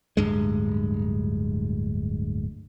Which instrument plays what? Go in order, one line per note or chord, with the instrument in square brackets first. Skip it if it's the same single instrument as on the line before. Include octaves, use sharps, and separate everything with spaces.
[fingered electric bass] D1 G2 G#3